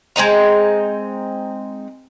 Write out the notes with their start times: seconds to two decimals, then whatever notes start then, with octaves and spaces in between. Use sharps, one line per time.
0.16 G#3 C4 D#4 A#5